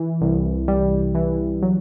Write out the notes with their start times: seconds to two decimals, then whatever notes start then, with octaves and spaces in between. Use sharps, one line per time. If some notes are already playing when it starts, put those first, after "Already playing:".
Already playing: E3
0.21 C2
0.68 G3
1.15 E3
1.62 F#3